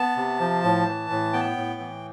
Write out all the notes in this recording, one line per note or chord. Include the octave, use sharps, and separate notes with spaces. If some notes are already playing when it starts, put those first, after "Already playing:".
Already playing: B3 A5
C3
F3
A2
E3
A2
B3 G5
A2
E3